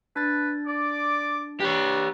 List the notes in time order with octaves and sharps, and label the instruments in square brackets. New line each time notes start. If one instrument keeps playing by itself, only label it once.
[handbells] D4 A6 [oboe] B4
[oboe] D5 [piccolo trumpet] D6
[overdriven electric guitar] G4 C#5 [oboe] B4 [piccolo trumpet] D5